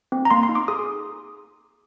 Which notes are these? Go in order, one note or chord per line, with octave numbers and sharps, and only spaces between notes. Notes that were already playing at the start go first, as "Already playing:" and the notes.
C4
A#5
A#3 C6
C6
D#4
D6
G#4 D#6